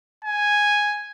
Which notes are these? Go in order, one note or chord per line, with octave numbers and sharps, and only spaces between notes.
G#5